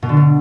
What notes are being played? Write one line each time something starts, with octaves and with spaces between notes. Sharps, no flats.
B2
D3
B2